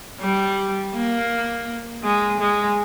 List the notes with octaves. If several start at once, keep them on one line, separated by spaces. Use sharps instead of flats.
G3
A#3
G#3
G#3